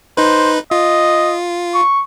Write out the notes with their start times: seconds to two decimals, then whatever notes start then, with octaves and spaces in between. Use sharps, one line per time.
0.17 D#4 B4 C5
0.71 F4 D#5
1.74 C#6